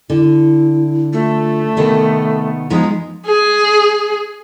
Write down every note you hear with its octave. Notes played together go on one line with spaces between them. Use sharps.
D3 E4
A3 F4
C3 D#3 B3 A4
F3 G#3 B3 D#4 A#5
G#4